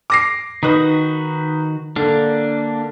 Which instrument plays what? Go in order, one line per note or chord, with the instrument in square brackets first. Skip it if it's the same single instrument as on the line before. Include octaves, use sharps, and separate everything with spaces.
[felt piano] D6 A#6 C7
[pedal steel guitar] D#3 F#4 D#6 [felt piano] D#4 B4
[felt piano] D3 [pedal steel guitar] A#3 D4